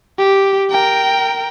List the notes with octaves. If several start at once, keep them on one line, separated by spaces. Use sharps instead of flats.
G4
A#4 G5